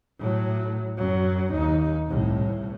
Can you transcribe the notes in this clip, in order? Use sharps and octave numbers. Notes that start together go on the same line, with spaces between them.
A2 F#3
F#2 F#3
D#2 D#4
C2 A2